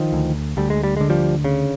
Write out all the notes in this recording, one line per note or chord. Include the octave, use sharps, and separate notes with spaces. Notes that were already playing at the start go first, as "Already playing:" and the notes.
Already playing: D#3 F3
D2
D2 G3
G#3
G3
D3 G#3
F3 G3
C#3